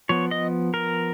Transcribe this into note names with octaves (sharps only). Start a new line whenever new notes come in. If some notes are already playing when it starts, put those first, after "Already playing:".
F3 B3 C#5
D#5
A#4